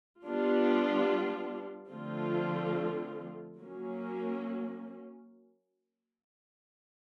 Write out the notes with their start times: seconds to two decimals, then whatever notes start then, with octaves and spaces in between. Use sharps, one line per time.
0.25 G3 B3 D4 F4
1.91 D3 F3 A3 C4 F4
3.58 F#3 A#3 C#4